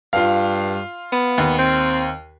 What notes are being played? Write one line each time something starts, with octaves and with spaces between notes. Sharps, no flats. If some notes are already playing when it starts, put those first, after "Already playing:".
G2 F4 F5
B3
D#2
C4